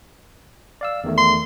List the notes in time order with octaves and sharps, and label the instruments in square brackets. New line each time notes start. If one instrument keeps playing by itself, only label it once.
[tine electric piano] D5 F5 E6
E2 D#3 A3
[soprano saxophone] C6